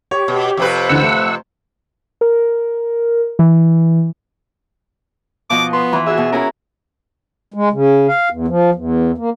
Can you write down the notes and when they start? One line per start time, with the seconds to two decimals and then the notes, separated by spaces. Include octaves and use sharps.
0.11 G4 C#5
0.28 B2
0.57 F2 C3 B4
0.89 D2 D3 E3 F#5 E6
1.02 A3
2.21 A#4
3.39 E3
5.50 B2 F3 D#5 D6
5.73 B3 C6
5.93 E3 C4 B5
6.06 F#4 G#4 E5
6.18 B2
6.32 C#4 E4 G#4 A#4
7.54 G#3
7.72 C#3
8.08 F5
8.31 E2
8.48 F3
8.75 E2
9.18 A#3